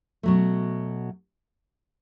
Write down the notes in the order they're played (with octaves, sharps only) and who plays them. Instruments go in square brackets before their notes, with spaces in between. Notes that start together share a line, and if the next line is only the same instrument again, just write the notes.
[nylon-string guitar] B2 F#3 A3